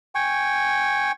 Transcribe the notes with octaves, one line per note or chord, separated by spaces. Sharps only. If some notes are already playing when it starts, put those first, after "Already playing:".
G5 G#5 C#6